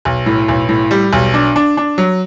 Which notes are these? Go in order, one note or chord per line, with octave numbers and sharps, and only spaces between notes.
B1
A2
B1
A2
G3
B1
D4
D4
D4
F#3